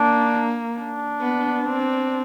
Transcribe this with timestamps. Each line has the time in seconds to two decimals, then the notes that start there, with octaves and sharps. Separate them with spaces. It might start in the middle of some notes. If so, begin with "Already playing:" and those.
Already playing: A#3 D4
0.78 D4
1.21 B3
1.64 C4